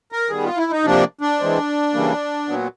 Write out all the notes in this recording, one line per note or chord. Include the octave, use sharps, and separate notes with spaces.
A#4
D#3 G3 B3 G#4
F4
E4
D#4
C3 F3 A#3 D4
D4
E3 G#3 C4
C#3 E3 G3 A#3
A#2 F#3 B3